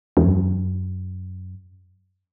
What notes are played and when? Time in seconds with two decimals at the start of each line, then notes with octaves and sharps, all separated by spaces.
0.17 E2
0.25 F#2